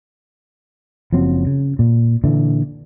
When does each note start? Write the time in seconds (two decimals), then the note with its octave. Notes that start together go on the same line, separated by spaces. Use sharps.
1.13 F#1 F3 F#3 C4
1.47 C#3
1.79 A#2
2.24 A#2 D3 E3